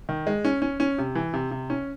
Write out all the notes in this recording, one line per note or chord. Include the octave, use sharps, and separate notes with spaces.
D#3
G#3
C#4
C#4
C#4
C3
E3
C3
C3
C#4